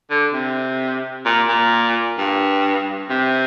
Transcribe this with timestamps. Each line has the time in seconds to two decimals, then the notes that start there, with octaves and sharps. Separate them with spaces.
0.10 D3
0.33 C3
1.26 A#2
1.48 A#2
2.18 G2
3.10 C3